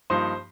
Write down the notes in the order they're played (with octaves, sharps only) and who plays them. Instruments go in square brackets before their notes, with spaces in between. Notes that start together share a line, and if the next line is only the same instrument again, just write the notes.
[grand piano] G2 F3 A#3 D#4 C5 C6